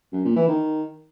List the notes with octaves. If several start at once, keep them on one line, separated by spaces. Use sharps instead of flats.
F#2
A#2
E3
D#3